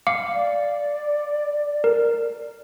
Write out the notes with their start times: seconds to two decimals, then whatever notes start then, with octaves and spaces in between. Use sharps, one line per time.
0.07 F5 D6 C#7
0.34 D5
1.84 A#4